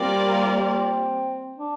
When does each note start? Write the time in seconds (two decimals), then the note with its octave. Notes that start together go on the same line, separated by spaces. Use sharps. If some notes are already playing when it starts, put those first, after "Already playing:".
Already playing: G3 A#3 C4 F4 A#4 D5
1.58 D4